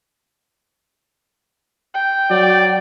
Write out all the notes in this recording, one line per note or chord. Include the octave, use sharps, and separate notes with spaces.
G5
F#3 D5